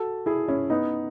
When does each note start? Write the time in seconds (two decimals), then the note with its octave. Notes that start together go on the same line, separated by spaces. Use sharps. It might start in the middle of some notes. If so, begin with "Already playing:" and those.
Already playing: F#4 A4
0.26 E4 G#4
0.48 C#4 E4
0.70 B3 D#4